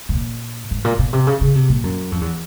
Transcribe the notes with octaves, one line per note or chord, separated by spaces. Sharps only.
A2
A#2
G#2
A#2
B2
C3
C#3
C#3
C3
A#2
F#2
F2
E2